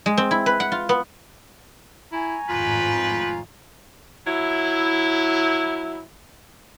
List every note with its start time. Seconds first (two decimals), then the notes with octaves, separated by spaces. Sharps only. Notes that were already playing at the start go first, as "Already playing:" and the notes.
0.06 G#3
0.18 C4
0.31 E4
0.46 B4
0.60 F#5
0.72 F4
0.89 B3
2.12 E4 G#5 A#5 C#6
2.49 G#1 F2 A2 F4 G4 B4
4.27 F#3 E4